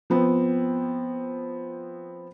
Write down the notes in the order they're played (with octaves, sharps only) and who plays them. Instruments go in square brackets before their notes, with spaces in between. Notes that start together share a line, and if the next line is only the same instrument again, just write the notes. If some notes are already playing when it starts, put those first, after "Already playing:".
[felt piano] F3 B3 C4